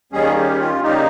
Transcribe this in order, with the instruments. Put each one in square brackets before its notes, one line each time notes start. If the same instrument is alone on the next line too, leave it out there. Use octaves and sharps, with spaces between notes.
[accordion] D#2 D#3 G3 C#4 G#4
G4
F4
C#3 G3 A#3 D#4 G4